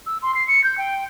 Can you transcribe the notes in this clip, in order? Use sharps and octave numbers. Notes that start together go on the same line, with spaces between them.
E6
C6
C7
C#7
G6
G5